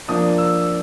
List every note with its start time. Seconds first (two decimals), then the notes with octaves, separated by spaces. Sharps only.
0.08 F3 A#3 D4 D#6
0.38 E6